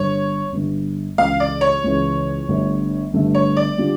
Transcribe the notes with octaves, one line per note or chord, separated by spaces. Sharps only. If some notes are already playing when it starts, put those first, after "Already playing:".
Already playing: G1 G2 D3 C#5
G1 G2 D3
C#2 C#3 E3 F5
D5
C#5
C#2 C#3 E3
G1 G2 D3 A3
G1 G2 D3 A3
C#5
D5
D3 G3 D4 F4